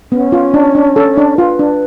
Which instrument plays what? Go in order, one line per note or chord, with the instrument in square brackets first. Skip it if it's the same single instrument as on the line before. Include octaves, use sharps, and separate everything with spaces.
[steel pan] B3 [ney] C#4
[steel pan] F4
D4
D4
A4
D4
[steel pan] F4 [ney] B4
[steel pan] D4